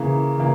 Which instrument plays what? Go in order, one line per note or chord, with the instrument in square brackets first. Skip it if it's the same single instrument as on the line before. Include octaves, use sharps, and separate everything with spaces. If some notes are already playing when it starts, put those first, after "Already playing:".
Already playing: [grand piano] C#3 E3 A#3
C#3 E3 A#3